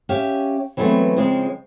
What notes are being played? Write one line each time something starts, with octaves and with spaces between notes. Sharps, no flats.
C#4 G4 E5 F5
E3 F#3 G#3 A3 B3 C4
C#3 F3 G#3 C4